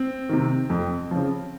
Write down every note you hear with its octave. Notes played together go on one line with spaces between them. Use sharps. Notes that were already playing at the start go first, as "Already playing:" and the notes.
Already playing: C4
C3 D#3
F2
C#3 F3